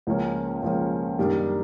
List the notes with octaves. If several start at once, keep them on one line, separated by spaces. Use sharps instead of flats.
C#2 C#3 F3 A#3 C#4
C#2 C#3 F3 A#3 C#4
F#2 D#3 G3 A#3 D4